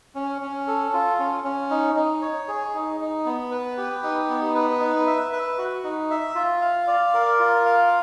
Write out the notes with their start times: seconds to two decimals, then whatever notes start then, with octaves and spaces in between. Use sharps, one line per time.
0.15 C#4
0.42 C#4
0.67 A4
0.93 F4
1.19 C#4
1.44 C#4
1.71 D#4
1.96 D#4
2.22 C#5
2.48 G#4
2.74 D#4
3.00 D#4
3.26 B3
3.51 B4
3.77 G4
4.03 D#4
4.29 B3
4.55 B4
4.80 D#4
5.07 E5
5.33 B4
5.58 F#4
5.84 D#4
6.10 E5
6.35 F4
6.61 F5
6.87 D5
7.14 A#4
7.39 F4
7.65 F5